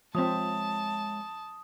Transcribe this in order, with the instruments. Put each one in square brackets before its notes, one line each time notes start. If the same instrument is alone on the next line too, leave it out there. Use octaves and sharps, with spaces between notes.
[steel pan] F3 C4 [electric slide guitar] G#3 C#5 E5 [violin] A5 [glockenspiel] D#6